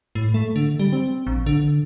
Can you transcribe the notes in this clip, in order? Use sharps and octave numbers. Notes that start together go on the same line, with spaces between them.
A2
A3
D3
G3
C4
A#1
D3